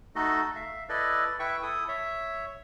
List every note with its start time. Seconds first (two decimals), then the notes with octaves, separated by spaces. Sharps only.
0.15 A3 D#4 F#4 A4 D#5
0.55 E5 F5
0.89 E4 A4 B4 D5 D#5
1.39 E4 B4 E5 G5 C#6
1.62 E4 A4 D#6
1.88 C#5 E5